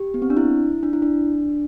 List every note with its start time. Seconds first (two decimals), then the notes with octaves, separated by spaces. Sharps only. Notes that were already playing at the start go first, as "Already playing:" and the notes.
Already playing: G4
0.14 B3
0.22 C4
0.30 D4
0.37 E4
0.83 D4
0.93 E4
1.02 D4